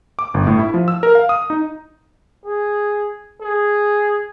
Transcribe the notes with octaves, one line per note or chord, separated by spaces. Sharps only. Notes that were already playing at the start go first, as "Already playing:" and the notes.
D6
G1
A2
E4
F3
E6
A#4
F5
D#6
D#4
G#4
G#4